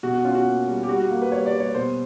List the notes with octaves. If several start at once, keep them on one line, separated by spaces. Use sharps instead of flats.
B2 F#4
F#4
C#4 F4
F#4
A#3
G3
G4
G3 F#4
F#4
A#3
B4
G3 C#5
D5
G3
C#5
B2 C5